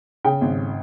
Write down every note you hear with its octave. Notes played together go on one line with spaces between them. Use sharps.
C#3 G5
G#1